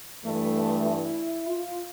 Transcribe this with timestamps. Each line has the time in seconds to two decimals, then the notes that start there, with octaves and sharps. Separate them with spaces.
0.24 G2 E3 A3
0.85 E4
1.46 F4